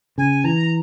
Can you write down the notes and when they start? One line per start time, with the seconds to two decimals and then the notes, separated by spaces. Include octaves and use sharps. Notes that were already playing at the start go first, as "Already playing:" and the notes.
0.18 C#3 G#5
0.44 E3 A#5